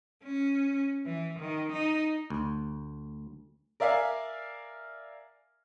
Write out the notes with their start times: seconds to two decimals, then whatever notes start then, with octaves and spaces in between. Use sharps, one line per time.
0.24 C#4
1.06 E3
1.39 D#3
1.72 D#4
2.30 D2
3.80 A#4 D5 E5 F5 G#5